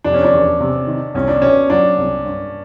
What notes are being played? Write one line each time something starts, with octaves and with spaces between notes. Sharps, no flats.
F1 D4
C#4
D4
E2
C3
D#3
C2 C#4
D4
B2 C#4
F#3 D4
C2
G2